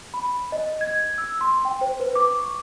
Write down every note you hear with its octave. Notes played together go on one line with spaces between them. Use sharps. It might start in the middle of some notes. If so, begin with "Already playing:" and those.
B5
D#5
G#6
E6
C6
G5
C5
B4
D6
C#6